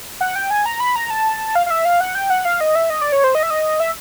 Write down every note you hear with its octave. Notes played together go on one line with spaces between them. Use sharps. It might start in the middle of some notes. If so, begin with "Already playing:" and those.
F#5
G5
G#5
A#5
B5
A#5
A5
F5
F5
E5
F5
F#5
G5
F#5
F5
D#5
E5
D#5
D5
C#5
C5
D#5
E5
D#5
E5